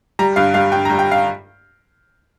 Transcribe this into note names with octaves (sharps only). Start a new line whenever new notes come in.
G3 A#5
G2 F5
G3 F5
G2 G5
A#5
G3
G5
F5